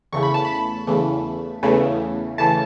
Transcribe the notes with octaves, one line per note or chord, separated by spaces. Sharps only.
E2 C#3 E3 A3 C#6
B5
A5
B5
E2 C#3 E3 A3
E2 C#3 E3 A3
C#3 E3 A3 A5